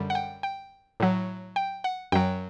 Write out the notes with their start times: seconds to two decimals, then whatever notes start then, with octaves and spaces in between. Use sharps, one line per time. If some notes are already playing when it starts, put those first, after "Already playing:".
Already playing: F#2 D3 G3
0.10 F#5
0.15 G5
0.43 G5
1.00 A2 F#3
1.56 G5
1.84 F#5
2.12 F#2 F#3 G5